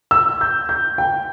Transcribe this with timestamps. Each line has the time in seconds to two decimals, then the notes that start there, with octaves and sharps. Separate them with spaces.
0.11 E6
0.41 G6
0.69 G6
0.98 G5